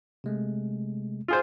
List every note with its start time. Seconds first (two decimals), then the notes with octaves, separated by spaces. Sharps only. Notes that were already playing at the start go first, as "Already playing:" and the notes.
0.24 C3 G#3 A3
1.28 F4 G#4 C5